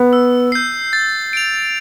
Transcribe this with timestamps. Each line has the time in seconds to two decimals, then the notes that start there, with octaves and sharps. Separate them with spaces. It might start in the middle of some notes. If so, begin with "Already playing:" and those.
Already playing: B3
0.13 E6
0.52 G6 C7
0.93 A6
1.33 D7 F7